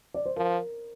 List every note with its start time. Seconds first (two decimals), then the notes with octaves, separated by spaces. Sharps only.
0.14 D5
0.26 C5
0.37 F3 A#4